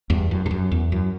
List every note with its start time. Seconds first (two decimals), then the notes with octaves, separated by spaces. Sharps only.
0.10 E2 G2
0.31 F#2
0.46 G2
0.51 F#2
0.72 E2
0.92 F#2